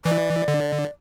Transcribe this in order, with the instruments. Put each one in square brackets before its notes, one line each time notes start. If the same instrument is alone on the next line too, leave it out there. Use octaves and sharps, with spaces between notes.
[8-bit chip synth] E3 [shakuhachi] D5
[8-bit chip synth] D3